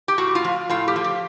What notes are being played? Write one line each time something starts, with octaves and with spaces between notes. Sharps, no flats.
G4
A2 F#4
F4
F3
A2 F4
G4
F3
G4